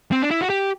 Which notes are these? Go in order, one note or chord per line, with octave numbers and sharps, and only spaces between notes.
C4
D4
E4
F#4
G4